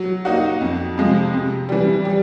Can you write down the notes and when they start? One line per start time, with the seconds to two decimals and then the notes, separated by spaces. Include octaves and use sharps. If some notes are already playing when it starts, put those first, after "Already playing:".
Already playing: F#3
0.25 A#3 D#4 F#4
0.61 F2
0.98 C3 F3 G#3
1.33 C3
1.69 E3 G3
2.05 G3